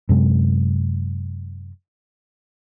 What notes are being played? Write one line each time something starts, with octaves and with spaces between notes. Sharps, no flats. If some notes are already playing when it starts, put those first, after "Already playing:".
F#2 C3 G#3